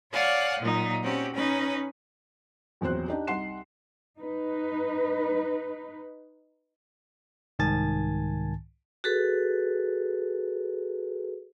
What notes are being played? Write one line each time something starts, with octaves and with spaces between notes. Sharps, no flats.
C#5 D5 F5 F#5 G#5
A#2 F#3 D#4
C4 C#4 F#4 G4
C#4 D#4 B4
A#1 E2 F#3 C4 C5 F#6
D4 D#4 G4
C2 D#4 F#5 C6 C7 E7
D#4 B4
C2 G#2 D#3 G#5 A5 A6
F#4 G#4 A4 B4